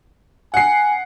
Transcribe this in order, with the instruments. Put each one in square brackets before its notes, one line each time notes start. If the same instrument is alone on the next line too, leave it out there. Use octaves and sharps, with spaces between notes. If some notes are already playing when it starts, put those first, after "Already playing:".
[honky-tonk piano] F#5 C7 [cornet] G#5